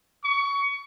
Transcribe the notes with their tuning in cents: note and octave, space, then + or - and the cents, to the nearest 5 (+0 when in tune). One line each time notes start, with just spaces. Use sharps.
C#6 +25